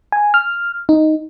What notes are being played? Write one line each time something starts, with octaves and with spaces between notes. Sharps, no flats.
G#5
F6
D#4